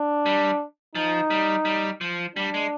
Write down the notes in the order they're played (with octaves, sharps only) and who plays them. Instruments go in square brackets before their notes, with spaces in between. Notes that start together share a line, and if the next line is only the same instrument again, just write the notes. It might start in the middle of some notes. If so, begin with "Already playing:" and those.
Already playing: [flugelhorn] D4
[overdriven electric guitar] G3
[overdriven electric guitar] F3 [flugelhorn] D#4
[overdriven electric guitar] G3
G3
F3
[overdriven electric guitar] G3 [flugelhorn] D4
[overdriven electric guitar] G#3